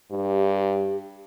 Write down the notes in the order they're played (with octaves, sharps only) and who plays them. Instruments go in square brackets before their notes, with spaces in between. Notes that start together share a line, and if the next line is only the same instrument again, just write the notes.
[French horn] G2 [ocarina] G4